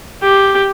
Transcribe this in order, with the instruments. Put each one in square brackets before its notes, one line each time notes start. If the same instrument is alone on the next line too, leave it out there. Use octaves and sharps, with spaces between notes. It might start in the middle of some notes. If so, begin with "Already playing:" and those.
[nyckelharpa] G4